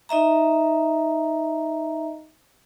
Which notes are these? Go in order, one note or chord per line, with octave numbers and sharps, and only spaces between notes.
D#4 D#5 E5 A#5